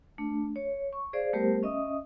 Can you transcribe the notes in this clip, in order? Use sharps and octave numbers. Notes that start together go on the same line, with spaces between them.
A3 D4
C#5
C#6
G#4 C5 D5 F5
G3 A3 B3 G4 A#4 C5
C#4 D#5 E5 D#6